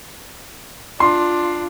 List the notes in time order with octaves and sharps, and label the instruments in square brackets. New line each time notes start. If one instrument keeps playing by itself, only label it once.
[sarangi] D4 [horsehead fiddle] F4 [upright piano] C6